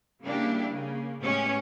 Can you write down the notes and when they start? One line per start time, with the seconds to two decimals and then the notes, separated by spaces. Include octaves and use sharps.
0.22 C#3 G3 A#3 D4 E4 G4
0.68 C#3 A#3
1.22 A2 G#3 B3 C#4 G4 C#5